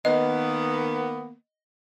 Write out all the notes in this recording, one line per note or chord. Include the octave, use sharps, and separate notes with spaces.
D#3 A#3 B3 D#5